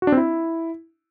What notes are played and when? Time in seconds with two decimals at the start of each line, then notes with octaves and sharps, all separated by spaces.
0.02 F#4
0.07 D4
0.12 C4
0.17 E4